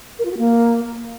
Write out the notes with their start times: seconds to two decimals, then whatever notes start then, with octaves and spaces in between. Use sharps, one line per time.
0.19 A#4
0.25 F4
0.31 F#4
0.38 A#3